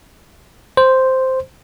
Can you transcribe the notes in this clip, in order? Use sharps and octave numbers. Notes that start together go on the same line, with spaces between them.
C5